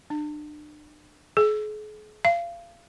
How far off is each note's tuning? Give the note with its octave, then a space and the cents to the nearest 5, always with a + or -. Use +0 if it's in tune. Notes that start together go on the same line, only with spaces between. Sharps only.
D4 +35
G#4 +40
F5 -30